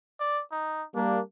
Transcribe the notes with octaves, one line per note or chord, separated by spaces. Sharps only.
D5
D#4
G3 A#3 D4